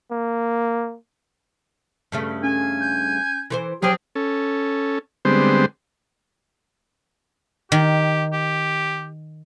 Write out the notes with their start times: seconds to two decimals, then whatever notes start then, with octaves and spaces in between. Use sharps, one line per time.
0.11 A#3
2.12 G2 C#3 A3
2.44 C#4 G#5
2.79 G6
3.50 E3 B4 C5
3.82 F3 F#3 C4 G4 G#4 G5
4.15 C#4 A4
5.25 D3 G3 G#3 B3 C4 C5
7.72 D#3 G4
8.33 G4